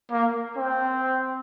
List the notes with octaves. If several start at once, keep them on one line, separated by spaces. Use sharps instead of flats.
A#3
C4